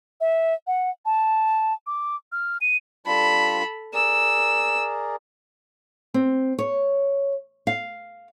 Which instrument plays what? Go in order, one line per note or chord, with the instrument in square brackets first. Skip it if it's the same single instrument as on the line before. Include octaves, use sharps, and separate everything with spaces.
[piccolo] E5
F#5
A5
D6
F6
D#7
[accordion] G3 D4 F4 [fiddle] A4 B5
[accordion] G#4 A#4 D5 [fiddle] E6
[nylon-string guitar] C4
C#5
F5